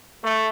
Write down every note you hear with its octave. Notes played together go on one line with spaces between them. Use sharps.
A3